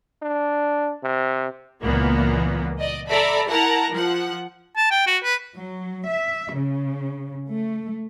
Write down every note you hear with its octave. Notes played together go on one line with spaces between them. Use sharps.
D4
C3
C#2 A#2 E3 A#3 B3
D5 D#5
A4 D5 E5 A#5 B5
E4 A#4 F#5 A5 A#5
F3 F#5
A5
G5
F#4
B4
F#3
E5
C#3
A3